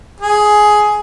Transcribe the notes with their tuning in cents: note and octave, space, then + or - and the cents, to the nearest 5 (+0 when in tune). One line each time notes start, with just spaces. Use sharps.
G#4 +10